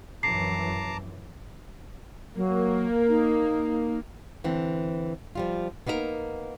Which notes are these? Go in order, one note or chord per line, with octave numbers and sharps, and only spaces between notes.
A#1 F#2 E3 A5 A#5 D6 C7
F#3 A#3
D#4
D3 E3 C4
F3 G3 F4
A#3 B3 D#4 E4 A#4